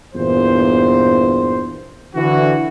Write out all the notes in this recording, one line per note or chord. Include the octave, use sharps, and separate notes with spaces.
E2 G2 A#2 C5
D3 E3 F#4